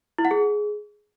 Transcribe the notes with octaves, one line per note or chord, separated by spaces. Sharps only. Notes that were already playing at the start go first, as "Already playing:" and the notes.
E4
F#5
G#4